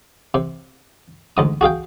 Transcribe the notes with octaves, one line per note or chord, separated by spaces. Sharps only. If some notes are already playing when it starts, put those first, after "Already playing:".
C3
D2 G#2 D#6
F#4 G#4 F5 G5